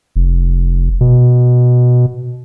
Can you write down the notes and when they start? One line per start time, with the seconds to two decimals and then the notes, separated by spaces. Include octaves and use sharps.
0.16 F1
1.01 B2